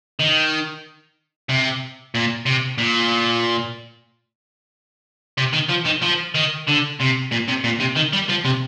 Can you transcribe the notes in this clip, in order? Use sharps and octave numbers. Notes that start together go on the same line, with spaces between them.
D#3
C3
A#2
C3
A#2
C3
D#3
F3
D#3
F3
D#3
D3
C3
A#2
C3
A#2
C3
D#3
G3
F3
C3